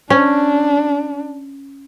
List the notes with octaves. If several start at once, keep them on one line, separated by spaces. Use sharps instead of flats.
C#4 D4